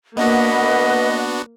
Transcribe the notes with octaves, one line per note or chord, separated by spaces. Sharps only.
A#3 B3 D4 F#4 B4 D#5 F#5